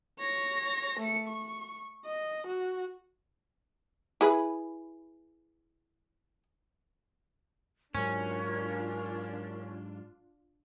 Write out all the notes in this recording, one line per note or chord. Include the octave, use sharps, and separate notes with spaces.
C#5 A#6
A3 C#7
C#6
D#5
F#4
E4 G#4 B4
G#2 F#3 C#4 D4 F4 A#4